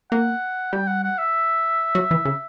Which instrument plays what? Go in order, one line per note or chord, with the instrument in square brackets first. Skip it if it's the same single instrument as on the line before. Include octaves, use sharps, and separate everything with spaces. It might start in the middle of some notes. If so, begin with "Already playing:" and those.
[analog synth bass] A#3 [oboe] F#5
[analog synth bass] G3 [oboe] G5
[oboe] F#5
F#5
E5
[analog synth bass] F#3
E3
C#3